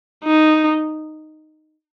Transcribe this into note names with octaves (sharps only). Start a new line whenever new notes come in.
D#4